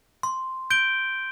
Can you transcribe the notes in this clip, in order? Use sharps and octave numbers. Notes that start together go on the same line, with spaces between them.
C6
G6 D7 G7